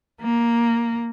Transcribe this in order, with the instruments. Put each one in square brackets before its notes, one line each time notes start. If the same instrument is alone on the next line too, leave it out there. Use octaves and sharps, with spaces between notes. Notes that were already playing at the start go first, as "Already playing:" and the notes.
[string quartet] A#3